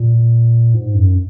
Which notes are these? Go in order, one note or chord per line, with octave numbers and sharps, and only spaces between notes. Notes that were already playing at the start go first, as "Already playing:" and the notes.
Already playing: A#2
G#2
F#2